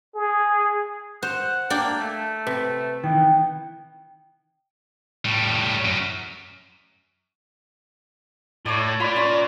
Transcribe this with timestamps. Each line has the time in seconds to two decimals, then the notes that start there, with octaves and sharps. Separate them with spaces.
0.15 G#4
1.23 C5 F#5
1.70 A#3 D4 D5 G5
1.99 A3
2.47 C3 B4
3.04 D#3 E3 B3 G5
5.25 A2 G3
5.85 F#2
8.66 A2 C#5 D5
9.00 F4 D5 B5
9.16 C#4 C6